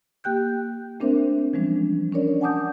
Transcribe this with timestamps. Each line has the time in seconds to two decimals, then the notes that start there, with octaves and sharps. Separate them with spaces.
0.24 A#3 G4 G5 F#6 G6
1.00 A3 C4 D4 A#4 C5 E5
1.53 E3 F3 G3 G#3 C#4 D4
2.12 C#4 D4 A#4 C#5 D5
2.41 F#5 G#5 A5 D6 D#6 G6